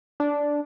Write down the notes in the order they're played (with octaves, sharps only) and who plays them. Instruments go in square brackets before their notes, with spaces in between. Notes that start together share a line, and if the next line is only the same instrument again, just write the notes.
[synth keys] D4